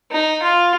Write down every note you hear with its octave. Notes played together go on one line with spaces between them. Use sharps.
D#4
F4